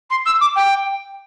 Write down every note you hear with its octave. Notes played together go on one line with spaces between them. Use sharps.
C6
E6
D6
G5